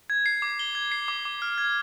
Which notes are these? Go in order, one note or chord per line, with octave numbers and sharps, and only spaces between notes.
G#6
C7
D6
G7
G#6
C7
D6
D6
F6
G#6